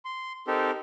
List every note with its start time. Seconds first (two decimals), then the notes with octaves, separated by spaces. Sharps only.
0.05 C6
0.47 C4 D#4 G4 A4 A#4